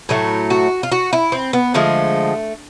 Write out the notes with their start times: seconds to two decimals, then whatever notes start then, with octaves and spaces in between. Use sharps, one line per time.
0.09 A2 F#3 A3
0.50 F#4
0.83 F4
0.92 F#4
1.13 E4
1.32 C4
1.53 B3
1.74 D3 F3 G#3 A3